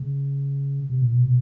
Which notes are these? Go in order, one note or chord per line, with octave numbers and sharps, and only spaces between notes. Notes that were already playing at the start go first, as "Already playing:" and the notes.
Already playing: C#3
C3
A#2
B2
B2